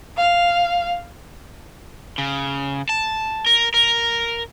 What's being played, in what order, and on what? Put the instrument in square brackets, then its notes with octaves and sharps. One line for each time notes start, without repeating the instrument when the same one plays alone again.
[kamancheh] F5
[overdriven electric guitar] C#3
A5
A#4
A#4